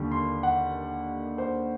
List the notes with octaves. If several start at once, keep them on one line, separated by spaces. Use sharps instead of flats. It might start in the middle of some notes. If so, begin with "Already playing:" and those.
Already playing: D#2 D3 G3
C6
F#5
C5